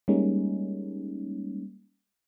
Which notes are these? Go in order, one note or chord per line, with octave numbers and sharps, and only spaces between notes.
G3 G#3 A#3 C#4 D#4